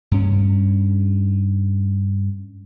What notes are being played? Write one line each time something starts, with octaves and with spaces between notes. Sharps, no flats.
G2 C#4